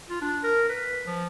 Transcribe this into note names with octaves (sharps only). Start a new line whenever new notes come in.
F4
D4
A#4
B4
F3